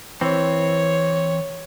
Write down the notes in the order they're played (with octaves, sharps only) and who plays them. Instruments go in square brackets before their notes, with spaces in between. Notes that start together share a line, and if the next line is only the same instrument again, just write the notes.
[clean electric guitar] E3 C4 [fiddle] C#5